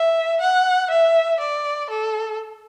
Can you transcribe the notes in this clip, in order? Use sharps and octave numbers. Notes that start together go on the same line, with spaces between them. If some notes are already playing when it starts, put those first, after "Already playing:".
Already playing: E5
F#5
E5
D5
A4